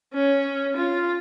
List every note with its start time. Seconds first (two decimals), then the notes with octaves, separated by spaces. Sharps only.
0.14 C#4
0.77 F4